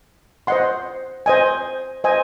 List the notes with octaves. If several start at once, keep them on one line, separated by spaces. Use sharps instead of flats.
C5 D#5 F#5 C6
C5 D#5 G#5
C5 D#5 G#5